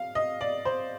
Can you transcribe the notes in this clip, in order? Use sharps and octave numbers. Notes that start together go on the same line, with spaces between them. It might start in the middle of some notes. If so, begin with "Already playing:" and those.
Already playing: F5
D#5
D5
C5